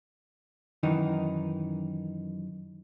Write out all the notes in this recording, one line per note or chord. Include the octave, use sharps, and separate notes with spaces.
F#2 D#3 E3 D#4